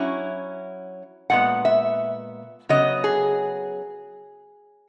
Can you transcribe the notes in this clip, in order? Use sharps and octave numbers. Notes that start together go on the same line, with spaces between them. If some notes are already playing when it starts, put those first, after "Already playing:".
Already playing: F#3 C#4 E4
A#2 G#3 B3 F#5
E5
C#3 F#3 B3 D#5
G#4